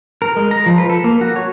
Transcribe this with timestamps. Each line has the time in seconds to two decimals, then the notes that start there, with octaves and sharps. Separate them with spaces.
0.22 A#4
0.36 G#3
0.51 A#5
0.66 F3
0.78 B4
0.89 A4
1.04 A#3
1.21 F#4
1.36 C#5